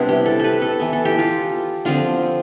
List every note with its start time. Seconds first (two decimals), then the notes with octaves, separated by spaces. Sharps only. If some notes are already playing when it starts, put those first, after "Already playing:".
Already playing: C3 G3 B3 D4 E4
0.09 G4
0.26 A4
0.40 A4 B4
0.62 A4
0.79 E3 B3
0.93 A4
1.05 G4
1.19 F4
1.85 D3 F3 C4 F4